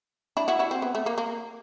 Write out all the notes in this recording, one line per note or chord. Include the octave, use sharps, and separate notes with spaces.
D4 E4
E4 F#4
E4 F#4
C4
B3
A3
A#3
A#3